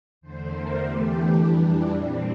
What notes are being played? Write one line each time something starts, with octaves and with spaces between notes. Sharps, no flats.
E2 D3 A3 C5
A#4
E2 E3 A3 G4
D4
F2 E3 G3 D4
A#2 G3 C4